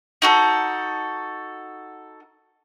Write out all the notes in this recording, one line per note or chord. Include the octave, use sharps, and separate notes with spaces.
D#4 F#4 A4